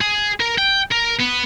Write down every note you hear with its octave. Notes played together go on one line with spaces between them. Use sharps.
G#4
A#4 A#5
G5
A#4
B3